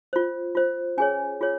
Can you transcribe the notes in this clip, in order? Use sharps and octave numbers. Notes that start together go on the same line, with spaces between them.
F4 C5
F4 C5
C#4 G#4 C#5 G#5
F4 G#4 C#5